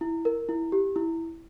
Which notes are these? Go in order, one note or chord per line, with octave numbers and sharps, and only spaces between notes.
E4
A#4
E4
G4
E4